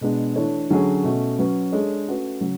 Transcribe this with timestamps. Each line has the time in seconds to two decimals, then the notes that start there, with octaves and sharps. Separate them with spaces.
0.01 B2 G#3 B3 D4
0.36 E3 A3 D4 A4 C#5
0.70 D3 F#3 C#4 G#4 C#5
1.04 B2 A3 C#4 F#4
1.39 F#3 C#4 F#4 B4
1.72 G#3 D4 A4 C#5
2.07 A3 C#4 F#4 B4
2.41 C#3 F#3